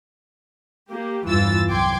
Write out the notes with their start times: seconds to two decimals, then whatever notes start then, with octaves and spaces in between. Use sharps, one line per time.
0.88 A#3 G4
1.26 E2 G2 E3 F4 E6 A6
1.68 C2 F#3 G5 C6 D6 G#6